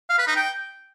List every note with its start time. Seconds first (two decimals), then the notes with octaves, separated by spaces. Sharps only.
0.09 F5
0.18 B4
0.27 D#4
0.36 G5